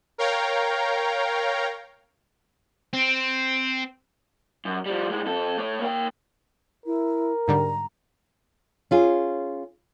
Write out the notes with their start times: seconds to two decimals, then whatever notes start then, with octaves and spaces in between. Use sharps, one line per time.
0.18 A#4 C#5 F5 G5 A#5
2.93 C4
4.65 F#2
4.86 F3 G3
5.09 A2 G#3
5.26 F2 A4
5.58 A3 C#5
5.81 A#3 G5
6.86 E4 A#4
7.48 G#2 D3 G3 A#5
8.91 C#4 F4 G#4